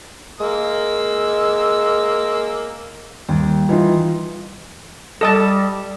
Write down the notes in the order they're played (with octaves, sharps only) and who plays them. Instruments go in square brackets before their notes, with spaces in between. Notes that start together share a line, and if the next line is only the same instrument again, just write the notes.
[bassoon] G#3 [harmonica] A#3 E6
[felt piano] D#2 [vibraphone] G3
[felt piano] E3 D#4 F4
[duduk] G3 [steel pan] A4 D#5 A5